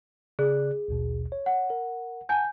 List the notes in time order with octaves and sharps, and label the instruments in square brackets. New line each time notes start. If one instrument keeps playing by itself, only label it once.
[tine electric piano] C#3 D5 F#6 [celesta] G#4
[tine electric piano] A#1 D#2 B2
C#5
[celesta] F#5
[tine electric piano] A#4
[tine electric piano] F#5 A5 [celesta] G#5 G6